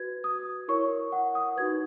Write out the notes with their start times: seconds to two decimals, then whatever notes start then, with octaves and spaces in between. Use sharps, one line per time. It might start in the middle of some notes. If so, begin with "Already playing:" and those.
Already playing: F#4 B4 G#6
0.24 D#6
0.68 E4 A#4 C#5 C#6
1.12 F#5
1.35 D#6
1.56 D#4 F#4 B4 G#6